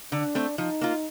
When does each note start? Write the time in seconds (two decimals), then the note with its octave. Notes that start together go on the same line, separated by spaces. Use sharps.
0.12 D3 D4
0.35 A3 C4
0.58 F3 D#4
0.81 A#3 F4